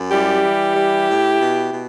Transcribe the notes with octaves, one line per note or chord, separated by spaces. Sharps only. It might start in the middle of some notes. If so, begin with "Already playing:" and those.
Already playing: F#2
G3 E4 G4
E3
G3
A2
B2
B2